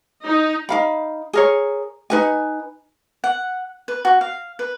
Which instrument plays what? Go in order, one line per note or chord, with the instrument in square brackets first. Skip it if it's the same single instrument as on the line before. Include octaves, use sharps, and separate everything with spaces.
[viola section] D#4
[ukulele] D#4 F5 B5
G#4 A#4 C#5
D#4 B4 G#5
[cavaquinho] F#5
B4
F#4
F5
B4